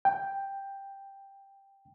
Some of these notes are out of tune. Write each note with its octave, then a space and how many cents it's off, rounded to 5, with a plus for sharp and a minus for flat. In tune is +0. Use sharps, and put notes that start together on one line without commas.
G5 +5